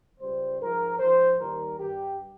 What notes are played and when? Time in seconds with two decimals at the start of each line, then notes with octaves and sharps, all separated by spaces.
0.20 C#2 C#3 G3 C5
0.60 G#2 F3 A#4
0.99 G#2 F3 C5
1.39 D#2 D#3 G3 A#4
1.78 G2 G3 G4